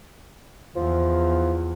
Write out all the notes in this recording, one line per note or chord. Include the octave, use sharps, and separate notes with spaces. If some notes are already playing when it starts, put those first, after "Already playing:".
E2 F3